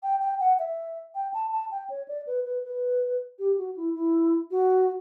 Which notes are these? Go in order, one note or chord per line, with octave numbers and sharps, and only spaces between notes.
G5
G5
F#5
E5
G5
A5
A5
G5
C#5
D5
B4
B4
B4
G4
F#4
E4
E4
F#4